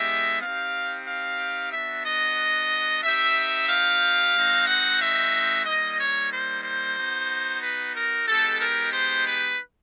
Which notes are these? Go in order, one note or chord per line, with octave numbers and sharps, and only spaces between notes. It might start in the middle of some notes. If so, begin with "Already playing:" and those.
Already playing: G#3 B3 D#4 G4 E5
C4 D#4 G4 F5
F5
B3 D4 F#4 E5
D#5
C4 D#4 G4 E5
F5
G#3 C4 D#4 F#4
F#5
E5
G3 A#3 D#4 D#5
C#5
C5
C5
B3 D#4 F#4
B4
A#4
G#3 B3 D#4 G4 A4
A#4
C5
B4